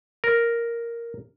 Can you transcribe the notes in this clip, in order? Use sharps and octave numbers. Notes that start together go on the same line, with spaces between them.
A#4